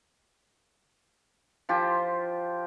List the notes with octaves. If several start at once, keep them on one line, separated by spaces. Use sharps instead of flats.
F3 F4 G4